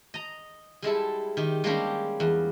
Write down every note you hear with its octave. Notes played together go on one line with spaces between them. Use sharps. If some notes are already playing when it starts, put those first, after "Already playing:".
D#5 A#5
G3 G#3 E4 A4
D#3 G4
G3 G#3 A#3 C#4 D4 G4
E2